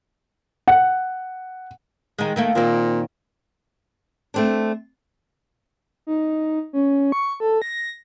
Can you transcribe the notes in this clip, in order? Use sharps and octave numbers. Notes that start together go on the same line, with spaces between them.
F#5
D#3 G#3
D#3 A3 A#3
A#2 D#3 A#3 C4
A3 C4 D4
D#4
C#4
C#6
A4
A#6